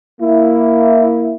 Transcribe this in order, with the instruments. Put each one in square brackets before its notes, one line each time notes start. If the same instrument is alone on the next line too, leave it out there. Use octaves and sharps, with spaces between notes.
[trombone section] A#3 E4